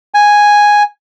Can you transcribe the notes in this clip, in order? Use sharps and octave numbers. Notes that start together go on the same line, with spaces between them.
G#5